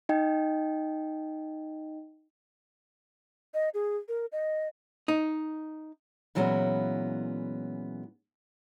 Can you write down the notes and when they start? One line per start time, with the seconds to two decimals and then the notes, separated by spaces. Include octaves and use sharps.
0.09 D#4 D#5 G5
3.54 D#5
3.74 G#4
4.08 A#4
4.32 D#5
5.08 D#4
6.35 A#2 E3 F#3 G#3 B3 C#4